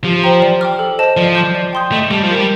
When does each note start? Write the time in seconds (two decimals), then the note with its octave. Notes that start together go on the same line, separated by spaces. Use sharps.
0.04 F3 G4
0.23 C5 G5 A#5
0.42 D5
0.61 G5 D6 F6
0.79 A4
0.99 C5 D#5 A5
1.17 F3 D5
1.35 A5 D6 G6
1.55 D5
1.73 G5 C6 D#6 G6
1.92 A3 D#5
2.11 G3 A5 D6
2.24 F3
2.30 A#4
2.35 G3